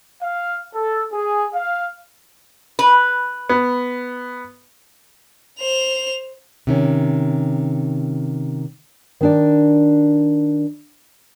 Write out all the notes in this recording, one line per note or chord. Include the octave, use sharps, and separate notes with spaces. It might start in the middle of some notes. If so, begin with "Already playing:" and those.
F5
A4
G#4
F5
B4
B3
C5 F7
C3 D#3 C#4
D#3 D4 D5